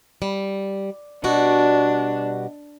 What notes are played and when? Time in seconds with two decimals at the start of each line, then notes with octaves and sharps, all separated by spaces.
0.22 G3
1.24 B2 G3 D4 F#4